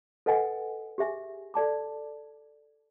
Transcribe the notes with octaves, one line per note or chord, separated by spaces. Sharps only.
A4 B4 D#5 F#5 G#5
G4 G#4 E5 G#5
A4 D5 A5 D6